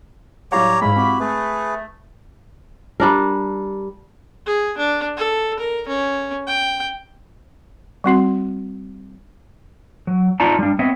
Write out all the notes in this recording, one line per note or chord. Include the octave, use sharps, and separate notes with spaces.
A2 F#3 G3 E4 G4 C#5 F5 A#5
G#2 G#3 E4 C#5 F5 B5
C4 F#4 G4
A3 G#4 B4
G3 D4 A#4
G#4
D4
A4
A#4
C#4
G5
G3 C4 F#4 C6
F#3
D#4 F4 D5 A5 A#5
G3 D4
B3 C4 C#5 D#5 E5